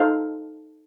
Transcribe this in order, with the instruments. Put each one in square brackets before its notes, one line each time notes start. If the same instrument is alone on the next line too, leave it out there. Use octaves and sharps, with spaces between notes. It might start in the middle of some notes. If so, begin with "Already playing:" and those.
Already playing: [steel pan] D#4 A4 C5 F5